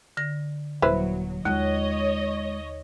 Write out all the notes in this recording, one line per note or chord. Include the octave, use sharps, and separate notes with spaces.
D3 A#6
D#1 F#3 E4 B4 C5
D#2 G#3 F4 C#5 D#5